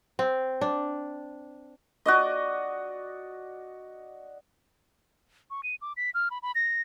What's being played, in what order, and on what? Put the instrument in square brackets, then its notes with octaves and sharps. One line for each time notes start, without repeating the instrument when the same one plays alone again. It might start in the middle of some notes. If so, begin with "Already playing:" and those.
[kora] C4
D4
[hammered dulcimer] F#4 D5 D#5
[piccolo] C#6
D#7
D6
B6
F6
B5
B5
A#6